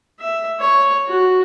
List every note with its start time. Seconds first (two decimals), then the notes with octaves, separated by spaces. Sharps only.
0.20 E5
0.60 C#5
1.07 F#4